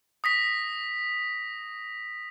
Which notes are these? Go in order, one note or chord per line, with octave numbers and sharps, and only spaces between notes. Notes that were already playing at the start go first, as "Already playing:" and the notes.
D#6 A#6 B6